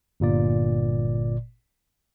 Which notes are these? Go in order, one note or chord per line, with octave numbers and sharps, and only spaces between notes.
G1 A#2 D5